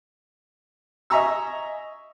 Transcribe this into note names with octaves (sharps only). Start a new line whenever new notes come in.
D#5 E5 G#5 A#5 C#6 E6